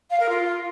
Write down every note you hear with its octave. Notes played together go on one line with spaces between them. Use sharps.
F5
A#4
F4